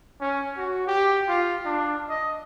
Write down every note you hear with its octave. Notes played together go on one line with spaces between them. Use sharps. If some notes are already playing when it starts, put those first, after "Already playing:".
C#4
F#4
G4
F4
D4
D#5